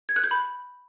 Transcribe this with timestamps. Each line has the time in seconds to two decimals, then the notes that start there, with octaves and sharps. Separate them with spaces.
0.09 G#6
0.16 F#6
0.24 G6
0.31 B5